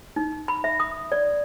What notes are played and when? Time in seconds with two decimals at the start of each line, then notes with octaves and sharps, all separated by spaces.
0.16 D#4
0.48 B5
0.64 E5
0.80 D#6
1.12 D5